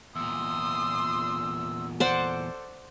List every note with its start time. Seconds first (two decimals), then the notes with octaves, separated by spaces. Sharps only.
0.15 E2 A#2 C6 D#6 E6
2.00 A4 C5 D5 F#5